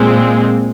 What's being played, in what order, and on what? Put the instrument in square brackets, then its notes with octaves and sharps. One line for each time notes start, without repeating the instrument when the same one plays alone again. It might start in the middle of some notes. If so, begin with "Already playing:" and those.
Already playing: [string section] A#2 G#3 C4